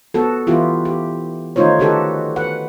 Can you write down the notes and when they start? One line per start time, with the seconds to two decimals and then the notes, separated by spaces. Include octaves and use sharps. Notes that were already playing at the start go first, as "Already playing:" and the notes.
0.14 B3 F#4 A4
0.47 E3 B3 E4 F4 G4
0.85 G4
1.56 D#3 A3 D#4 F4 C5 C#5
1.79 D3 D#4 F#4 G4 A4 B4
2.36 B4 F#5